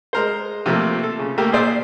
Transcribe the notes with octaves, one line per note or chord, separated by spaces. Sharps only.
G#3 A#4 C5
C3 F3 A3 A#3
A4
C#3
A3 A#3 G4 A#4
A#2 G#4 C5 D5 E6